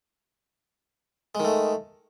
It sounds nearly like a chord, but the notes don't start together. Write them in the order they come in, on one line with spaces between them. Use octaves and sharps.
G#3 D#3 A3